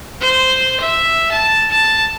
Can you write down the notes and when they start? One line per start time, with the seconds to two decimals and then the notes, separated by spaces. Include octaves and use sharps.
0.21 C5
0.81 E5
1.32 A5
1.71 A5